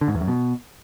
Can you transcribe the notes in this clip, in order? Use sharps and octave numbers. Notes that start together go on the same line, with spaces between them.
D3
G#2
E2
F#2
B2